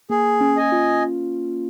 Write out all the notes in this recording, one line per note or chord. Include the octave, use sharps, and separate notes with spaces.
A#3 G#4
C#4
D#5 G#5
F4